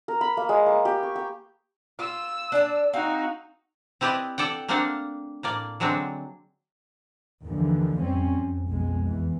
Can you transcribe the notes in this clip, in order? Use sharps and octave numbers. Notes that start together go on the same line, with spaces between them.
A#4
B5
A#3
G#3
A#3
G4
C#6
G5
F4 E6
D4 D5 A5
C4 D#4 F#4 F5
C4 E4 G4 B4 D5 D#5
A4 D5 F#5 G5
A3 A#3 C4 D4 F5 F#5
A2 A#3 D5
D3 F#3 G#3 C4 D4
D#2 D3 E3 F3
F2 G3 C4 C#4
F2
B1 F2 B2 G#3
E2 E3